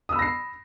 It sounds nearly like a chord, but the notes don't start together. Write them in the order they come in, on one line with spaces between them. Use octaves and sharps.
D#6 E6 B5 A#6 C7